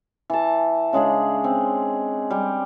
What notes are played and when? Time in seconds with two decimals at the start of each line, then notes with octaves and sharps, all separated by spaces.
0.30 E3 A5
0.93 C#3 G#3 D4 G#4
1.44 C4
2.31 G3